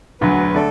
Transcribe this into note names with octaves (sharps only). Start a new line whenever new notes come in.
E1 D2 D3 F#3 B4
D3 A3 A4 D5